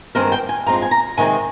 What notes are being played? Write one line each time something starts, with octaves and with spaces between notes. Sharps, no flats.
G2 D#3 G#3 C4 A#4
G5
G#5
G2 F3 G#3 C4 A#5
G#5
A#5
C3 D#3 G#3 C4 G#5